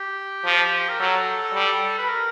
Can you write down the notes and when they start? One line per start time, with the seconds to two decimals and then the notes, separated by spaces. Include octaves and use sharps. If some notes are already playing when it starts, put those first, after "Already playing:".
Already playing: G4
0.45 F3
0.89 A#4
1.00 F#3 A4
1.54 G3
1.98 B4
2.08 A#4